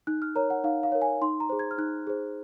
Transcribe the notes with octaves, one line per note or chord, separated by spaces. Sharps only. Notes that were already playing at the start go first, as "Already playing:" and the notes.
D#4 F#6
F6
A#4 C#5 A#5
F#5
D#4 F5
F5
A#4 C#5
G#5
D#4 C6
A#5
G#4 C5
G#6
F6
D#4 F#6
G#4 C5